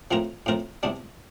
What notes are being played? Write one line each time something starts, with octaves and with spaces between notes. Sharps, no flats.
A2 F3 C4 F4 A#4
A2 F3 C4 F4 A#4
E2 C3 G3 D4